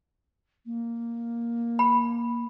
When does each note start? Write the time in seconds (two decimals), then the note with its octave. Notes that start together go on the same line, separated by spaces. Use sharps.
0.66 A#3
1.79 B5